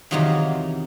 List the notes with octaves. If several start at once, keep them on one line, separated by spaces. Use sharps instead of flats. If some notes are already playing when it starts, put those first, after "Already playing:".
E2 C3 D#3 F#3 D#4 F4